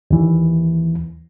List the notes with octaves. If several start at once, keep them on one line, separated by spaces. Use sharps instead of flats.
D#2 E3